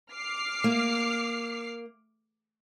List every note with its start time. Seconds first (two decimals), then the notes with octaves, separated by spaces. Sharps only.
0.13 D6 F6 C7
0.64 A#3